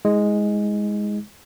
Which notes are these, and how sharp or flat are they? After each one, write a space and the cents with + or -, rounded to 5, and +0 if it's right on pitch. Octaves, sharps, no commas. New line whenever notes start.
G#3 +0 E4 -45